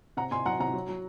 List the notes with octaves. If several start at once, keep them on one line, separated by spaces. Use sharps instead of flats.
C3 F#5 A#5
C3 G#5 C6
F#3 F#5 A#5
C3 F#5 A#5
F#3
F#3